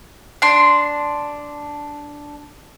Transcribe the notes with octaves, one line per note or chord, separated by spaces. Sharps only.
D4 C6